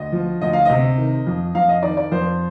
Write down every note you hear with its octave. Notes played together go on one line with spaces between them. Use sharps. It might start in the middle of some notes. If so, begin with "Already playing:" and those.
Already playing: D2 D#5
F3
D2 D#5
F5
C3 D#5
D#3
F2
F2 F5
D#5
D#3 D5
D5
F2 C5